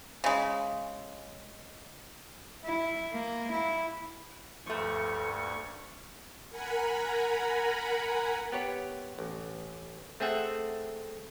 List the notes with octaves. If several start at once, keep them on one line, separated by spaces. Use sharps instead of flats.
C#3 G#3
E4
A#3
E4
D2 G2 F3 A3 C#6
A#4 F#5 G#5 A#5 B5
B3 G4 C#5
A1
A3 C4 G#4 E5 F#5